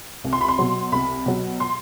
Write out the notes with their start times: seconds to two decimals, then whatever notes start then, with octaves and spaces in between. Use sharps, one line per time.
0.24 C2
0.33 C6
0.41 B5
0.48 C6
0.58 B2 F#3
0.92 C2 B5
1.26 B2 F#3
1.60 C6